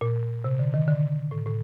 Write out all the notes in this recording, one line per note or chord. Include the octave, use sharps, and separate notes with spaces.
A#2
C3
D3
D#3
D3
A2
A2